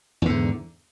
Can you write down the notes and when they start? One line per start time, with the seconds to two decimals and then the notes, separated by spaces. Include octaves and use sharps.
0.22 E2
0.26 D3
0.29 G#2